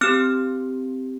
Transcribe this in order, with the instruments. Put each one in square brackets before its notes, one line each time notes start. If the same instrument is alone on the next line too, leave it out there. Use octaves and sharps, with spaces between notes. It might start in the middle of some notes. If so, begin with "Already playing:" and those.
[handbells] C4 G4 F6